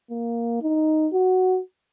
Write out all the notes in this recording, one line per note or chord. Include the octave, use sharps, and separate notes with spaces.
A#3
D#4
F#4